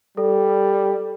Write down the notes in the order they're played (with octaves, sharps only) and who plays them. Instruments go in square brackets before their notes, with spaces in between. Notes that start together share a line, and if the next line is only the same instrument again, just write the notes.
[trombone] G3 [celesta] A4